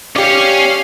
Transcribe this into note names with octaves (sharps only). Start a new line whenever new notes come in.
C#4 G4 C#5 D5 F5